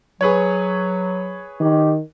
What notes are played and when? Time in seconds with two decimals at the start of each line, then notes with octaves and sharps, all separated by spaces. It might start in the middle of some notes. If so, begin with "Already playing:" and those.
0.21 F#3 G#4 B4 C#5
1.60 D#3 G4